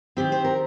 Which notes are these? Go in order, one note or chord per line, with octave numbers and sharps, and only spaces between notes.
D#3 C4 G4
C5
A#4